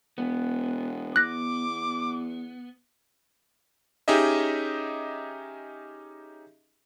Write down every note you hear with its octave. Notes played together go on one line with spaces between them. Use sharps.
E1 B3
E2 D6 F#6 A#6
C#4 D#4 G4 G#4 D#5 E5